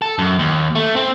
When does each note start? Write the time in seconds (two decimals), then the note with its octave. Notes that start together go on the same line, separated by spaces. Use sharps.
0.02 A4
0.19 F#2
0.39 D#2
0.75 A3
0.96 C4